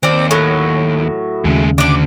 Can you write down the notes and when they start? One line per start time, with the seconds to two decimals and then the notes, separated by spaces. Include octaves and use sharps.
0.03 D#2 C4 D5
0.31 A2 F#3
1.44 D#2 C#3 G#3 A3
1.78 D2 D3 D4 D5